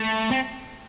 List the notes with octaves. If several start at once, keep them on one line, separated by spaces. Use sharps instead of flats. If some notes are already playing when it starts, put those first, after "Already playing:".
Already playing: A3
C4